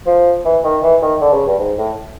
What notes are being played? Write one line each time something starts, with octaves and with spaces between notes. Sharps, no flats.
F3
E3
D#3
E3
D#3
D3
C#3
G2
G#2
A2